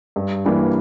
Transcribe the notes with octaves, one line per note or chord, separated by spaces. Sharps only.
G2
E3 G3 A#3 D4